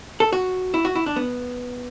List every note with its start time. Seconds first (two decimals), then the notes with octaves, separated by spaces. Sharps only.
0.20 A4
0.32 F#4
0.74 E4
0.85 F#4
0.95 E4
1.06 D4
1.16 B3